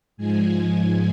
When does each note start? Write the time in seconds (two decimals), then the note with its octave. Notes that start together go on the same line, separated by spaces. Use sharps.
0.17 G#2 F3 G#3 G#5